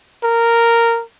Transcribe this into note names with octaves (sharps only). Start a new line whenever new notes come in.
A#4